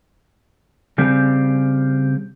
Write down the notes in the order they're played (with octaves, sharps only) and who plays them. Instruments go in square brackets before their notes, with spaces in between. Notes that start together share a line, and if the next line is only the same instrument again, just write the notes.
[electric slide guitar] C#3 G3 C4